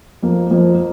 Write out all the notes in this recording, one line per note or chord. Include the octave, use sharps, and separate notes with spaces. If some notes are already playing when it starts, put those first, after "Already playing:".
F2 F3 A#3
F2 F3 A#3